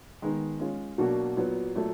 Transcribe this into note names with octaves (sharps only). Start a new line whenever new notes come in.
D#3 G#3 B3 D#4
G#3 C#4 F4
B2 F#3 A#3 D4 F#4
A#2 F#3 B3
A#2 F#3 A3